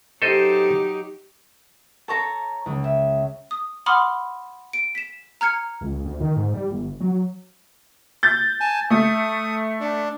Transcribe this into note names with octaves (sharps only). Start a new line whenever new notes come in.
F#3 D#4 G4 A4 C5 D#5
A4 C#5 A5 A#5
C#2
E5
D#6
F#5 B5 C6 D6 D#6 F6
D7
B6 E7
A#5 F6 G#6 C#7
C#2
D2
D#3
G#2
G3
G1
F#3
G6 A6
G#5 A5
A3 D#6
D4